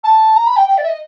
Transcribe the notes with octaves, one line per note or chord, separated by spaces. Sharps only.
A5
A#5
B5
G5
G5
D5
E5
D#5